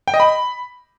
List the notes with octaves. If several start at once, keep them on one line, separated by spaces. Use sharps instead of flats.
G5
D#5
B5